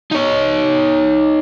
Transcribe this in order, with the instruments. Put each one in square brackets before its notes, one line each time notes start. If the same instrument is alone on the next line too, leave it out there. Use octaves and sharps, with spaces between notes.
[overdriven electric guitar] D#4 C#5